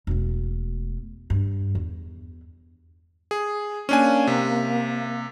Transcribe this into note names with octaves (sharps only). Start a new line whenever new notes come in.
E1 A3
G2
E2
G#4
A#3 C#4 D4 G#5
C3